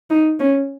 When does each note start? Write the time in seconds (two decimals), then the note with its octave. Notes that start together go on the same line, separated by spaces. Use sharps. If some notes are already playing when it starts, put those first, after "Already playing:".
0.10 D#4
0.40 C#4